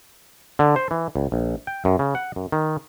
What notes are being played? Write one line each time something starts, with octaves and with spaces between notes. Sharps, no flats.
D3
C5
E3
C#2
A#1
G5
F#2
C#3
F#5
F#2
D#3